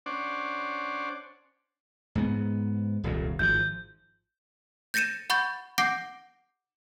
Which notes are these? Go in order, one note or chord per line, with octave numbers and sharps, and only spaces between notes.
C#4 D4 C5 D5 F#5
G#2 B3
D#1 C2 F#2
G#1 D#3 F3 G6
G6 A6 A#6 C#7 D#7 E7
F#5 B5 C#6 G6 A6
F#5 D6 G6 A#6 C7 D7